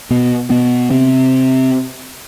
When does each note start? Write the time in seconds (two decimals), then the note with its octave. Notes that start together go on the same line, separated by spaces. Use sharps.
0.10 B2 B3
0.50 B2 B3
0.91 C3 C4